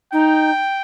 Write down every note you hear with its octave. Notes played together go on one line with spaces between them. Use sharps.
D#4 G5